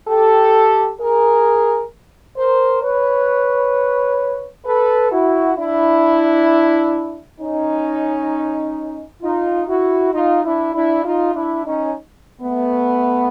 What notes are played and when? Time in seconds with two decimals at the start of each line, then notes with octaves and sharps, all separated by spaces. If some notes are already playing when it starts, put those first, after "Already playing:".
0.08 G4 A4
1.00 G#4 A#4
2.37 A#4 C5
2.83 B4 C#5
4.66 A4 B4
5.11 E4 F#4
5.57 D4 E4
7.40 C#4 D#4
9.22 D#4 F4
9.68 E4 F#4
10.13 D#4 F4
10.44 D4 E4
10.74 D4 E4
11.04 D#4 F4
11.35 D4 E4
11.65 C#4 D#4
12.41 A3 B3